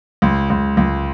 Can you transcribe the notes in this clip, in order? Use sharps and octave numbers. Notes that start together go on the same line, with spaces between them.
C#2
C#2
C#2